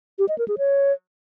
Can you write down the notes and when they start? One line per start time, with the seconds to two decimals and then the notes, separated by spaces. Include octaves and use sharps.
0.19 G4
0.29 D#5
0.38 A#4
0.48 G#4
0.58 C#5